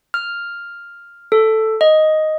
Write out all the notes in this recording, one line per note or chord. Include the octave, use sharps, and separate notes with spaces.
F6
A4
D#5